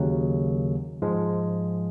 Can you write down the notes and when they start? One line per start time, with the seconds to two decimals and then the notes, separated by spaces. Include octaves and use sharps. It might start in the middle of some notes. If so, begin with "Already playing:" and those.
Already playing: D#2 C#3 F#3
1.02 G#2 F3 G#3